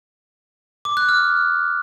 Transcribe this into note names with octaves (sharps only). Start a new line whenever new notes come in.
D6
F#6
F6